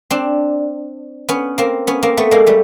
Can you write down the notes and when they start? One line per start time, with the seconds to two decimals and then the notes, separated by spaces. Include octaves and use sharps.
0.10 C4 D4
1.29 B3 C#4
1.58 A#3 C4
1.87 B3 C#4
2.03 A#3 C4
2.17 A3 B3
2.31 G#3 A#3
2.47 G3 A3